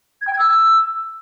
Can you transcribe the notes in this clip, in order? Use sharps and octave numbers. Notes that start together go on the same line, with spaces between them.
G#6
G5
G#6
E6